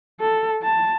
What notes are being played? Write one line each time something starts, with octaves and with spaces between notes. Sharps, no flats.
A4
A5